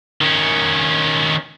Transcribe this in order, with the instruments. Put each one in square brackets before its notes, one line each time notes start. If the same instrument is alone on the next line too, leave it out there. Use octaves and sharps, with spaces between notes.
[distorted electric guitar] D#3 C#4